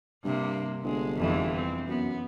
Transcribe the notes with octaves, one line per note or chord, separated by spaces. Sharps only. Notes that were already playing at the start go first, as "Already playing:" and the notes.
G2 C3 A#3
G1 G#3
F2 E3 G#3
C4
F#2 B3